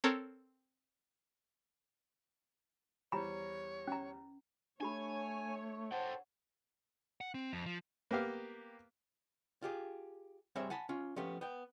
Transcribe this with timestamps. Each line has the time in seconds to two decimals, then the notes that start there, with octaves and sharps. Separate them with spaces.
0.04 C4 A4 A#4 C#5
3.12 E2 G3 C5 C#5 A#5 B5
3.87 C#4 A#5
4.80 A3 D4 G4 C#5 G#5 B5
5.92 A4 C5 F#5 G5
7.21 F#5
7.34 C4
7.53 F2
7.66 F3
8.11 A#3 B3 G4 F5
9.62 F4 G4 G#4
10.55 G3 C4 G#4 C5 C#5 E5
10.70 F#5 G#5 A5 B5
10.89 C#4 F4
11.16 F3 A3 B3 C#4 G4
11.41 B3 G5